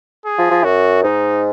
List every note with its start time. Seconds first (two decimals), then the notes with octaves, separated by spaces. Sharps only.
0.26 G#4
0.39 F3
0.51 F3
0.64 F#2 F#4
1.03 G#2 D#4